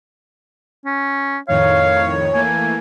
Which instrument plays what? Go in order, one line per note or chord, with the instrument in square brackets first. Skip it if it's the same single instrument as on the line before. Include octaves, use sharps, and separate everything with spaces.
[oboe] C#4
[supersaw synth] F2 A2 D#3 [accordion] C#5 [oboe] F5
[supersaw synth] E3 A3 A#3 [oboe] G#5